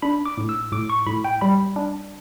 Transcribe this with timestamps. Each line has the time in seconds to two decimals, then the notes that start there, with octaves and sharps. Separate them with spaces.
0.02 D4 B5
0.25 D6
0.38 A2
0.49 E6
0.72 A2 D6
0.90 C#6
1.07 A2 B5
1.24 G5
1.41 G3 B5
1.76 D4